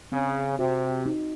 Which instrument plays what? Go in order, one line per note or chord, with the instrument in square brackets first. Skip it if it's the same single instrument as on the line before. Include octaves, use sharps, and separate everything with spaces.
[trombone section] C#3 [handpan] C4
[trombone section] C3 [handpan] F#4
[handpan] D#4